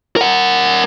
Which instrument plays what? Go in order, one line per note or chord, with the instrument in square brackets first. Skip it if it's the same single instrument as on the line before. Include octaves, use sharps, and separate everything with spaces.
[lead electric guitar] A#4 F#5